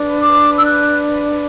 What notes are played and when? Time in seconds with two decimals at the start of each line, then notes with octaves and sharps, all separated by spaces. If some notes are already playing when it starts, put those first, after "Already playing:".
Already playing: D4 B4
0.20 D6
0.58 E6
0.65 F#6